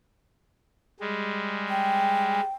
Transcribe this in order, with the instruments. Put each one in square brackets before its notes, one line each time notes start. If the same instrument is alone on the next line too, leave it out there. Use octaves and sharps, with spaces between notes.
[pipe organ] G3 G#3
[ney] G5